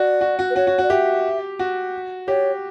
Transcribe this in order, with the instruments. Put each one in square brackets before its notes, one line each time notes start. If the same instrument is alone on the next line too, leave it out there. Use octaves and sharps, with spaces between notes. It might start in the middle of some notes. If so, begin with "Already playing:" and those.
Already playing: [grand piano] F#4 [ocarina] D5
[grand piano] F#4
F#4
[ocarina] B4
[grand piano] F#4 [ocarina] C#5
[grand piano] F#4
F#4
[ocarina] D5
[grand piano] G4 [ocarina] E5
[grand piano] F#4
[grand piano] G4 [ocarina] C#5